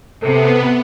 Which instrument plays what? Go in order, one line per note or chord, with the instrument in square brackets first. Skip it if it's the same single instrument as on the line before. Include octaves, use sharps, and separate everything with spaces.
[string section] C3 [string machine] B3 [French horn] A4